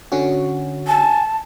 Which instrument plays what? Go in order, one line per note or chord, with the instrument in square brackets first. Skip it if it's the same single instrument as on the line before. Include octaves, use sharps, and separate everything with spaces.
[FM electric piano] D3 C#4 F#4
[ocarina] G#5 [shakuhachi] A5